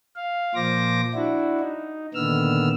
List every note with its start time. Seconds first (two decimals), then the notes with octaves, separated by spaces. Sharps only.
0.16 F5
0.55 A#2 F3 C5 D6 A#6
1.14 D4 E4 F#4
1.60 D#4
2.14 A#2 D3 D#3 B3 E6 F6